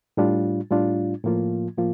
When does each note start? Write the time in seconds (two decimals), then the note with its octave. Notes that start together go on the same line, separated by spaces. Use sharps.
0.17 A2 G3 D4 F4
0.71 A2 G3 D4 F4
1.24 A2 F3 A#3 F4
1.77 A2 F3 A#3 F4